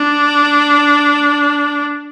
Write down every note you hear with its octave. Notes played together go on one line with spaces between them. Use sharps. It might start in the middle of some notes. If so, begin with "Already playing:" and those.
Already playing: D4